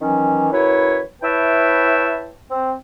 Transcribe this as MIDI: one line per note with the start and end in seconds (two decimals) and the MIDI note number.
0.01 0.48 51
0.01 0.48 52
0.01 0.48 54
0.01 0.48 61
0.52 1.01 42
0.52 1.01 64
0.52 1.01 71
0.52 1.01 73
1.22 2.31 64
1.22 2.31 71
1.22 2.31 73
1.22 2.31 76
1.22 2.31 79
1.22 2.31 81
2.49 2.72 60